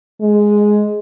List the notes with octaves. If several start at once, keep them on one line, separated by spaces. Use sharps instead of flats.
G#3